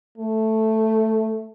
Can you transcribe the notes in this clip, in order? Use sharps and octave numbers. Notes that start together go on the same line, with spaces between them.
A3